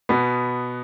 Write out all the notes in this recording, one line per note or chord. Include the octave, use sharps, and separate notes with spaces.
B2 B3